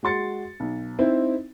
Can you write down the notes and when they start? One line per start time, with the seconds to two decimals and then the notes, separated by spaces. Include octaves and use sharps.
0.03 G#3 F#4 C6 A6 C#7
0.60 B1
0.99 C4 D#4 E4 C5